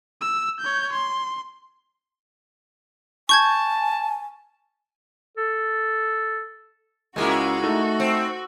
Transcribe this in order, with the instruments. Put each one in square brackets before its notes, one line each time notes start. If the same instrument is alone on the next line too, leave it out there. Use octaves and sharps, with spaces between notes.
[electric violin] E6
C#5 G6
C6
[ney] G#5 [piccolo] A5 [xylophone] C#6 G6 G#6
[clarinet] A4
[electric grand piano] C#2 G#4 [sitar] G#3 A#3 E4 [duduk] C#4 [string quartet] F#4
[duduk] A3 [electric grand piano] D#4 A4
[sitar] C4